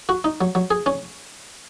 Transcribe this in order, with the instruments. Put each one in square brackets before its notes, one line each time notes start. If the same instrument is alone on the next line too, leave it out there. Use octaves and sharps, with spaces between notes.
[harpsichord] F#4
D#4
F#3
F#3
G#4
C#4